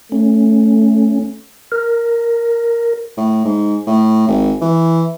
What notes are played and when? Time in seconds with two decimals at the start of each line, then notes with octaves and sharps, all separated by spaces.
0.12 A3 C#4
1.72 A#4
3.18 A2
3.45 G#2
3.87 A2
4.28 G#1
4.61 E3